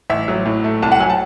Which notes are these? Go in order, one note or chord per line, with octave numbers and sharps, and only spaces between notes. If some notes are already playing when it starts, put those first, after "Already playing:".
A1 E5
F#3
A2
A3
C2 A5
F#5
F#3 G#5
A5